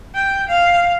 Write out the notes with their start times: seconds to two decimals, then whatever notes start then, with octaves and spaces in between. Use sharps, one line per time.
0.15 G5
0.48 F5